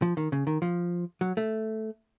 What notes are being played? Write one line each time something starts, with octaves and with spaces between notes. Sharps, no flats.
F3
D#3
C#3
D#3
F3
F#3
A3